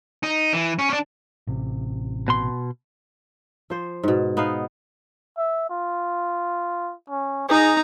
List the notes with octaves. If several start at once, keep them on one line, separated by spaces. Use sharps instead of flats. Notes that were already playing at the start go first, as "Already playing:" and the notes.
D#4
E3
C#4
C#4 D4
A1 C3
B2 C6
F3 C5
G#2 B2
B3 D#4 F5
E5
F4
C#4
D#4 G#4 A#5